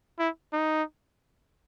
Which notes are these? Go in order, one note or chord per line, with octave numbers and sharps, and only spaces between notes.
E4
D#4